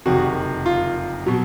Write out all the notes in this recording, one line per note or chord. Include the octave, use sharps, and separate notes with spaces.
F#1 F2 C3 D#3 F#4
F4
B2 F#3